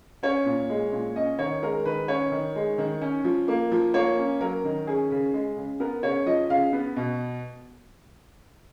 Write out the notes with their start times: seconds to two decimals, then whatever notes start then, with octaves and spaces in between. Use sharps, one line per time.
0.23 C#4 C#5
0.46 A#2
0.69 G#3
0.92 A#2
1.15 C#4 D#5
1.39 D#3 C#5
1.62 G#3 A#4
1.85 D#3 B4
2.08 C#4 C#5
2.32 D#3
2.55 G#3
2.78 D#3
3.01 C#4
3.24 F3
3.48 A#3
3.71 F3
3.94 A#3 C#5
4.17 C#4
4.41 F#3 A#4
4.65 D#3
4.87 C#4 G#4
5.11 C#3
5.34 G#3
5.57 C#3
5.80 B3 A#4
6.03 C#3 C#5
6.26 F3 D#5
6.50 C#3 F5
6.73 B3
6.96 B2